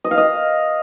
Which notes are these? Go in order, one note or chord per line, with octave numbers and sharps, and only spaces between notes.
D#5
F5
D#5